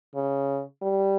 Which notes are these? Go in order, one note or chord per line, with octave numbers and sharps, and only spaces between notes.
C#3
G3